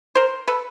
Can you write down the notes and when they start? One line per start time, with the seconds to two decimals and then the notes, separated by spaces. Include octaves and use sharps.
0.15 A#4 C5
0.48 A4 B4